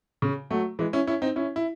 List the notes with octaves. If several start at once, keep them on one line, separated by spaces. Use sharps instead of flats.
C#3
F#3 A3
E3 G#3
C#4 E4
C#4 E4
C4 D#4
C#4 E4
E4